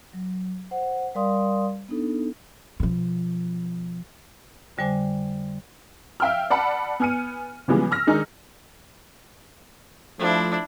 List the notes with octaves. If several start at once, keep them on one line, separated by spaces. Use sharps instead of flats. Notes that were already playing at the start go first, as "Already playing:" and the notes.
F#3
C5 F#5
G3 A#4 D5 F5 C6 D#6
B3 D4 D#4 A4
B2 F3
F2 D3 G3 C5 G#5 D6
E5 F5 G5 E6 F6
D5 F#5 A5 B5
B3 G#5 F6 C#7 D#7
C#3 E3 F3 G3 G#3 B3
E6 F6 A#6
D#3 G#3 D4 D#4 G#4
F3 A3 D4 E4